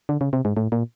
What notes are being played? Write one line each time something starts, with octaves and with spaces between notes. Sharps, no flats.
D3
C#3
C3
G#2
A2
A#2